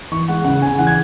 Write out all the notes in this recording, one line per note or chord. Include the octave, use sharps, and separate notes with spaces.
E3 C#6
G#3 F#5
C#3 F#5
C#3 G#5
E3 F#5
G#6